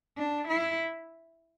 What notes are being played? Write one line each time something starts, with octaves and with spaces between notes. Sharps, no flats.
D4
E4